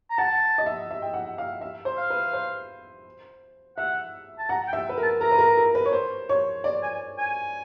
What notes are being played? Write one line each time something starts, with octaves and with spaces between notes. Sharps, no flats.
A#5
F#5 A5
D#5
E5
E5
G5
F#5
F5
E5
C5
F5
B4
C5
E5 F#5
A5
F#5 A#5
G5
E5
B4
A#4
A5
A#4 A#5
B4
A#4
A#4
B4
C#5
C5
C#5
D5
G#5
G#5